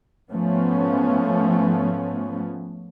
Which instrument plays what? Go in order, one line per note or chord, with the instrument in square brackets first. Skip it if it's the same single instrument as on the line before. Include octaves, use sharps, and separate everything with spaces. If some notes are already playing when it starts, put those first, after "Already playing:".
[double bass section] G#2 F3 A3 B3 C#4